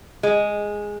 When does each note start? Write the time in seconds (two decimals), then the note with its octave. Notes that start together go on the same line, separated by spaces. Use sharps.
0.23 G#3